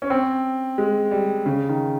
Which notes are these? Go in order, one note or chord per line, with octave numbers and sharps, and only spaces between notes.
C#4
C4
G#3
G3
C#3
D#3